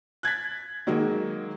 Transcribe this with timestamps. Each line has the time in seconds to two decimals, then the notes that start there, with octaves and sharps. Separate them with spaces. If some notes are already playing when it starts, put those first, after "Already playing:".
0.23 F#6 G#6 A6 B6
0.87 D#3 F#3 G#3 A#3